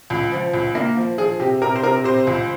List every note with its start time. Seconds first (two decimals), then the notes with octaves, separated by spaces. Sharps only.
0.10 C#2
0.32 F3
0.53 C#2
0.75 A#3
0.97 F3
1.18 F3 G#4
1.39 C3 G4
1.61 C3 A#4
1.76 C5
1.83 C3 A#4
2.04 C3 C5
2.27 C#2